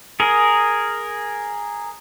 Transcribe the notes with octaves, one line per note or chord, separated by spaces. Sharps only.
G#4 A#4